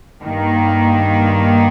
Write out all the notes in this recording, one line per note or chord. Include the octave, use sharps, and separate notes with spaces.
G2 D#3 A#3